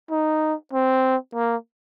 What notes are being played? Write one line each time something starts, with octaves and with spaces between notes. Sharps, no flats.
D#4
C4
A#3